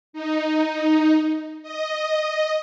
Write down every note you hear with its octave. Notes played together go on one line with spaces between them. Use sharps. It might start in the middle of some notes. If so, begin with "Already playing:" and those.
D#4
D#5